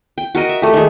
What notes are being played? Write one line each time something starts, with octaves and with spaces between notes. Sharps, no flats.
G5
F#4 A#4 D#5
E5
A3 G4
D#3 G#3